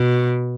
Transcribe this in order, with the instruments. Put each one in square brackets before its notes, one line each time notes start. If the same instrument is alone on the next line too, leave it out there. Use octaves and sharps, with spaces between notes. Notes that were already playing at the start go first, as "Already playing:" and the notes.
Already playing: [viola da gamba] B2